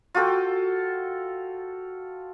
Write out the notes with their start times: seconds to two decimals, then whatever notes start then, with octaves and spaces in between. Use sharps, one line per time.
0.15 F4 F#4 A4 G5